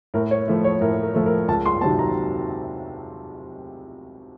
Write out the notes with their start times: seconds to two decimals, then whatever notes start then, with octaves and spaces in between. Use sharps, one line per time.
0.14 A2 A#4
0.31 C#5
0.48 F3 A3
0.64 C#5
0.81 A2 A#4
1.03 A#4
1.14 F3 A3
1.26 A#4
1.48 C#2 A5
1.66 C6
1.81 C3 D#3 F#3 C4 A5
1.99 A#5